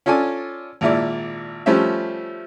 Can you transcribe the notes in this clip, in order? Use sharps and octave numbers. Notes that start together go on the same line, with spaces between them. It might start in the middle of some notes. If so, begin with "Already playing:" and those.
C#4 F4 A4 D5 G#5
G#1 A#2 E4 D5
F3 G3 A3 C#4 C5 E5